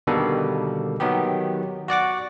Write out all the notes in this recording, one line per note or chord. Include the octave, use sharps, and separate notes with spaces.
B2 D3 D#3 G3 A#3 A4
D#3 F#3 B3 G4
F#4 D5 F#5 D6